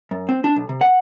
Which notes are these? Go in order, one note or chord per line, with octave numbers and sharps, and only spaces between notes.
F#2
C4
D4
B1
C3
F#5